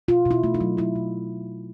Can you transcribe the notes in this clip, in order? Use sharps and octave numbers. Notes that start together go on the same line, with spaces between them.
B2 F4
B2
E4
A3
D#4
F#3
F#3 E4
B2